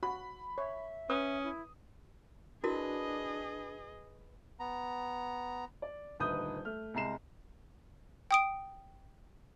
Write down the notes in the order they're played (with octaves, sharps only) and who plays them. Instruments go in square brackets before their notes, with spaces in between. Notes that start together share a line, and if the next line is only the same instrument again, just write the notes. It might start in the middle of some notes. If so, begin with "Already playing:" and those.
[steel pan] F#4 [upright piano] B5
[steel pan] C#5 [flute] E5
[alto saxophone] C#4 [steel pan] B4 [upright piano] D#6
[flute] E4
[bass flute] D4 [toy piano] E4 F#4 A#4 [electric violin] G#4 D#5 [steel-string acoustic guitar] B4
[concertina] B3 A#5
[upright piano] D5
D#1 D2 D#4 B4 D#6 G6
A3 F6
C2 G#3 A#5 C7 E7
[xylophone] G5 D#6 D7